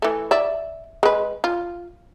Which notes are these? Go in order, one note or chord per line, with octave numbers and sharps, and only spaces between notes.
E3 A3
D5 E5
G#3 B4
F4